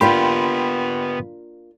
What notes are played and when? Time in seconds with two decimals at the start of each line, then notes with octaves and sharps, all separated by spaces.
0.01 A#3 B3 D4 F4 G4 G5 B5 C6